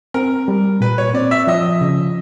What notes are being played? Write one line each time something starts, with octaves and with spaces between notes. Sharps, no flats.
C4 A#4
G3
A#2 B4
C#5
C4 D5
E5
F3 D#5
C#3